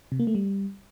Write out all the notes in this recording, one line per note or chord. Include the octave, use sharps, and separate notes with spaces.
C3
A#3
A3
G3